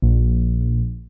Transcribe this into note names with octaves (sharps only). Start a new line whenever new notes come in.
A#1